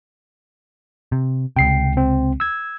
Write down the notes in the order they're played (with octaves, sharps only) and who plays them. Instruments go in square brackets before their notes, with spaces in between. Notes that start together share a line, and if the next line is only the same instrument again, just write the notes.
[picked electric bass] C3
[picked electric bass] C#2 C3 [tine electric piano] G5 C7
[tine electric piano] C4
E6 G#6